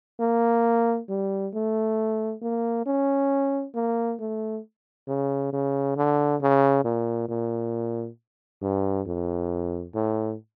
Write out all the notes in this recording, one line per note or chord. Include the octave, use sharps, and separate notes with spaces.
A#3
G3
A3
A#3
C#4
A#3
A3
C#3
C#3
D3
C#3
A#2
A#2
G2
F2
A2